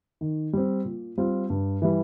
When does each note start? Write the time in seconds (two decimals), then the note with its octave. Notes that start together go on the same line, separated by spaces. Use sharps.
0.21 D#3
0.53 G3 C4
0.85 A#2
1.18 G3 C4 F4
1.50 G2
1.82 E3 G3